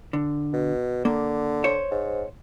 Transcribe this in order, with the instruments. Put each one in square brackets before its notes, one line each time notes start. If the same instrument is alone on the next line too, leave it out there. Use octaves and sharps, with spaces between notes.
[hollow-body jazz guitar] D3
[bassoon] B2
[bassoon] D3 [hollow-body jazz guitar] A#3
[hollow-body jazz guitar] C5 C#5
[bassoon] G#2